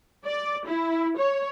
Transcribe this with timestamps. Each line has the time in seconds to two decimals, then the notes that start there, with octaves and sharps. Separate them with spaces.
0.25 D5
0.66 E4
1.17 C#5